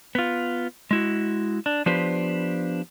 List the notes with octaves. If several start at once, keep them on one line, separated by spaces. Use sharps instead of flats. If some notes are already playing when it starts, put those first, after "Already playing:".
B3 F4
G#3 E4 F#4
D4
F3 B3 D4 G4 B4 C5